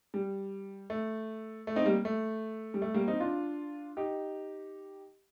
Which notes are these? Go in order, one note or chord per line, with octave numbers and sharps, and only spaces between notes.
G3
A3
A3
C4 D#4
G3 A#3
A3
G3
A3
G3 A#3
C4 D#4
D4 F4
D#4 G4